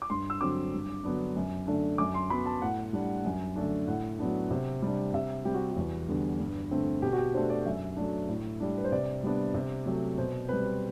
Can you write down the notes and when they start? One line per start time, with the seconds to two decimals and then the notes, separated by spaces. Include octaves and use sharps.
0.02 D6
0.10 G2 C6
0.30 E6
0.41 D3 F#3 C4 D6
0.73 G2
1.04 D3 F#3 B3 D4
1.36 F#2
1.67 D3 A3 D4
1.98 F#2 D6
2.14 C6
2.30 F#3 B3 B5
2.46 A5
2.62 A2 F#5
2.93 G3 D4
3.25 F#2
3.56 D3 A3 D4
3.87 A2 F#5
4.19 F#3 B3 D4
4.50 C3
4.82 G3 D4
5.14 C3 E5
5.45 G3 C4 G4
5.54 F#4
5.72 E2 F#4
6.09 D3 G3 B3
6.40 G2
6.71 D3 A3 C4
7.02 B2 G4
7.13 F#4
7.18 G4
7.34 A3 D4 C5
7.50 D5
7.66 F#2 E5
7.97 F#3 A3 D4
8.29 A2
8.60 G3 D4
8.78 B4
8.84 C5
8.92 C3 D5
9.23 G3 B3 D4
9.54 C3
9.86 F#3 A3 C4
10.18 B2 C5
10.49 G3 C4 B4